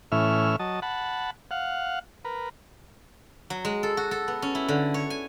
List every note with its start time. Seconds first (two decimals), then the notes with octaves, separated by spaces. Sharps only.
0.12 A2 E3 C#4 E5 F6
0.59 F#3 D#5 A5
0.82 F#5 A5 B5
1.51 F5 F#5
2.25 A#4 B4
3.50 F#3
3.65 G#3
3.83 A4
3.97 F#4
4.11 A4
4.28 B3
4.42 C#4
4.55 E4
4.68 D3
4.94 C#5
5.10 G#5